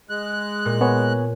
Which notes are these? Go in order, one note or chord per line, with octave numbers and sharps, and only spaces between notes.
G#3 F#6
A#2
B3 C#5 G#5